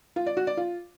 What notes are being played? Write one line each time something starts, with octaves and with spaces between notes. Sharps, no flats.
F4
D5
F#4
D5
F4